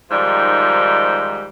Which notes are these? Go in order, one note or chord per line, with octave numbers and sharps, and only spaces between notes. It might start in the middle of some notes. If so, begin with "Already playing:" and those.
G#2 D#3 F3 G3 D#4